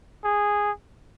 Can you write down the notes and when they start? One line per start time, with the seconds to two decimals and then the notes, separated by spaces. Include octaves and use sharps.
0.24 G#4